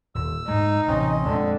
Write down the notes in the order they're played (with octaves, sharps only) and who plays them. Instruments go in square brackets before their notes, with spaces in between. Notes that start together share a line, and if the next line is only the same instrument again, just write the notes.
[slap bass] D#1 [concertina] E6
[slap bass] G#2 G#3 [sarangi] D#4
[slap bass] A1 C3 E3 [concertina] C4 C#4 D#5
[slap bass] F2 A#2 G#3 [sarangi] D3